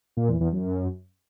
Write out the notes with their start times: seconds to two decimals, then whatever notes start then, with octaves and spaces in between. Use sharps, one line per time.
0.17 A#2
0.29 E2
0.41 E2
0.52 F#2